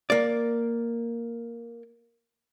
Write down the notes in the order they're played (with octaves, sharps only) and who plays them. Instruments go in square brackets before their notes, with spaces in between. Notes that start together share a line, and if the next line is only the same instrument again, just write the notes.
[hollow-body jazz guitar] A#3 D5